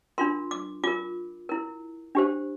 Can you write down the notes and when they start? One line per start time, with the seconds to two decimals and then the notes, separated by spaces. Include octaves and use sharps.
0.18 D4 F4 A#4 C6
0.51 D6
0.84 F4 A#4 D6
1.49 E4 A#4
2.15 D4 G4 C5